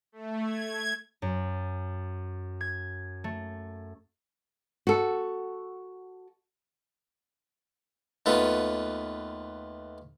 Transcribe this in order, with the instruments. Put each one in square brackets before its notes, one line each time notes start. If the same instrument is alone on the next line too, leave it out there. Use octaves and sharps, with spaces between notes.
[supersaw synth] A3
G#6
[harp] F#2
G#6
A3
[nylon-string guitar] F#4 A4
[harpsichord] D#2 A3 B3 F4